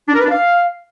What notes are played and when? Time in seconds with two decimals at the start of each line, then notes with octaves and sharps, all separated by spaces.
0.08 D4
0.14 A#4
0.19 B4
0.25 D4
0.31 F5